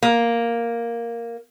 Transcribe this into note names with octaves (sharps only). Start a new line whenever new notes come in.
A#3